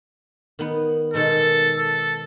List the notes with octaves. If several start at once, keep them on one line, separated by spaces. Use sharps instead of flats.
D#3 B3
B2 D#3 G#3 A4
A4